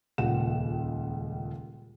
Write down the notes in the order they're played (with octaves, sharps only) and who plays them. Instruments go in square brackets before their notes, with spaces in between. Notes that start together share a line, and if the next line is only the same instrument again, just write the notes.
[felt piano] D#1 C#2 A#2 F#5 E7